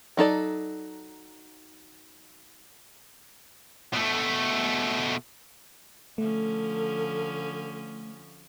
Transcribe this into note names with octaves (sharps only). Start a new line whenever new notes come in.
F#3 D#4 A4 D5
B2 A3
D3 F3 A3 C#4 A4